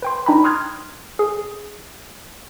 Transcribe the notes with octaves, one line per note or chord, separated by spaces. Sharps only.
B4 G5 C6
D4 D#4 G5 A#5 B5
C6 D#6 F6 F#6 G#6
G#4